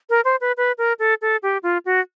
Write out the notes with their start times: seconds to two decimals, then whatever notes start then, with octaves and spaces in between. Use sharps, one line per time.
0.10 A#4
0.25 C5
0.41 B4
0.57 B4
0.78 A#4
0.99 A4
1.22 A4
1.43 G4
1.63 F4
1.86 F#4